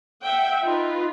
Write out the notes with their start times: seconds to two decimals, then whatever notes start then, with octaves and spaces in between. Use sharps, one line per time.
0.23 E5 F#5 G5
0.62 D#4 F4 B4